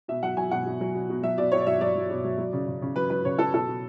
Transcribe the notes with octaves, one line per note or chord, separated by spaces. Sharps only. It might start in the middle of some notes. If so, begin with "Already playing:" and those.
B2 E5
F#3 F#5
F#3 G#5
B2 F#5
B2
F#3
B2
B2
F#3 E5
B2 D5
B2 C#5
D5
F#3 E5
F#3 D5
F#3
B2
F#3
F#3
C#3
C#3
C#3
F#3 B4
F#3 B4
C#3 C#5
F#3 A4
B2 A4
B2